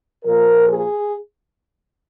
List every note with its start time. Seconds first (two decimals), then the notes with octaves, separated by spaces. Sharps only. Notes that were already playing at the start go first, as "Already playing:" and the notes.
0.24 A#2 F3 A#3 A#4
0.67 G#4